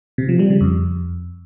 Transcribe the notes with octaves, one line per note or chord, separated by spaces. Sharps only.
C3
F3
G3
C#3
F2